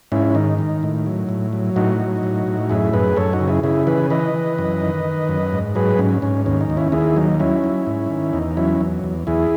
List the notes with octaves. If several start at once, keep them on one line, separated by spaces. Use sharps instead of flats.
G#2 C#4 E4
D#3 D#4
D#3
A2
F#3
A2
F#3
A2 D#4 F#4
F#3
A2
A2
F#2 E4 G#4
F#2 G#4 B4
F#2 A4 C#5
D#4 F#4
C#3
E4 G#4
C#3 E4 G#4
E3 G#4 B4
E3 B4 D#5
E3
F#2
D#3
D#3
F#2
G#2
F#3 G#4 B4
G#2 C#4
G#2 C#4
D#2 C#4
D#4
D#2
C#4 E4
D#2 E4 G#4
F#3 D#4
F#3 C#4 E4
F#3
G#2
D#3
E2 D#4
F#3 C#4 E4
E2
E2
E2 E4 G#4